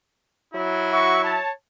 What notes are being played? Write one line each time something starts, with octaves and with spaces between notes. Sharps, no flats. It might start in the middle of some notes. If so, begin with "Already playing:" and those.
F#3 E4
F#4 E5 C#6
C#5 A5